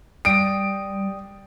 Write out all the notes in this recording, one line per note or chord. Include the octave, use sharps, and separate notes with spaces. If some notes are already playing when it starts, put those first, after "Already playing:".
G3 D5 G5 D#6 D7